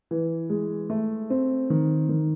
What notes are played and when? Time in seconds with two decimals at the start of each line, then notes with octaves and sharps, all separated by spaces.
0.11 E3
0.50 G#3
0.90 A3
1.30 C4
1.70 D#3
2.09 D#3